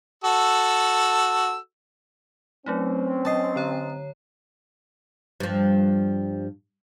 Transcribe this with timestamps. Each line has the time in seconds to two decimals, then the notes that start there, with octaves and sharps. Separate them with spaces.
0.24 F#4 A4 E6
2.66 F#3 A3 C4 C#4 D#4
3.25 F#3 D#5 A5 C7
3.56 D3 C#5 A#5
5.40 G2 F3